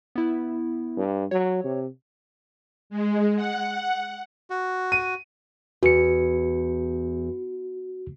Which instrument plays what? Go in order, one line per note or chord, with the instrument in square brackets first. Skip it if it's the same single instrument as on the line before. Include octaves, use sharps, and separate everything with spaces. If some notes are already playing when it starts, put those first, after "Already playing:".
[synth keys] B3 E4
[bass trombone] G2
[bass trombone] F#3 [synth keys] C#5
[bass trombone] C3
[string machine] G#3
F#5
[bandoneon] F#4
[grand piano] D#7
[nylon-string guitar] E2 [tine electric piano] F#4 C#7